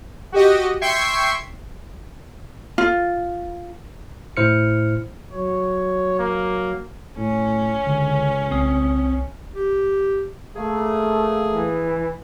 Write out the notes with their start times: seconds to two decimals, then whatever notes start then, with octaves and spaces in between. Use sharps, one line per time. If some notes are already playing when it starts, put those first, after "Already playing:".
0.32 F#4 G4 D#5
0.81 E5 G5 C6 C#6 G#6 C7
2.78 F4
4.37 A2 E4 C5 F6 C#7
5.32 F#3 C#5
6.19 A#3
7.18 A2 C#4
7.86 C#2 D3
8.51 C2 C4 D#6
9.55 G4
10.55 A3 A#3 G#4
11.48 E3